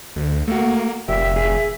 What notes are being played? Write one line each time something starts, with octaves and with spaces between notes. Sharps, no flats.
D2
A3 A#3 F#4
F1 A#2 G4 E5
G#4